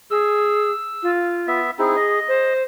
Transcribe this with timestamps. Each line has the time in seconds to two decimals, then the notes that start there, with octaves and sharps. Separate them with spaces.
0.11 G#4 E6
1.03 F4
1.47 B3 E5
1.79 C4 D#4 E4 G#4
1.96 D#5
2.28 C5